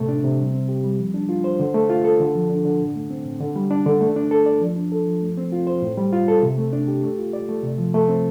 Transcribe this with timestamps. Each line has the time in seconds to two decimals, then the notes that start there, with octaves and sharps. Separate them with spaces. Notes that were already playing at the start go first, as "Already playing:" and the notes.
Already playing: A2 C3 A3
0.09 D4
0.24 C3
0.39 G3
0.54 C4
0.69 G4
0.84 G3
0.99 F3
1.14 D4
1.29 F4
1.44 C5
1.60 D3
1.74 A3
1.90 F4
2.04 A4
2.20 D3
2.35 F3
2.50 D4
2.65 D3
2.80 A2
2.96 A3
3.10 C4
3.25 A2
3.40 D3
3.56 G3
3.71 D4
3.86 D3
4.01 A3
4.16 D4
4.31 A4
4.46 D5
4.61 F3
4.76 D4
4.92 A4
5.07 F3
5.22 A3
5.37 C4
5.52 F4
5.67 C5
5.82 A2
5.97 G3
6.13 F4
6.28 A4
6.42 C3
6.58 A3
6.73 D4
6.88 G4
7.03 A3
7.18 F4
7.33 D5
7.49 A3
7.63 C3
7.78 F3
7.94 A3
8.09 C4